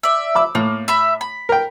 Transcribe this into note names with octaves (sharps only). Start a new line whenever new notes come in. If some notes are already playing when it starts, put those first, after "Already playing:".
D5 E5
B5 D6 E6
A2 A#3
E5 B5
B5
A#4 G5